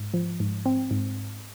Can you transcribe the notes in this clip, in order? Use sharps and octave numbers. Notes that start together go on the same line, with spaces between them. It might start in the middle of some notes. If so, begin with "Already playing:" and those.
Already playing: G#2
F3
G#2
C4
G#2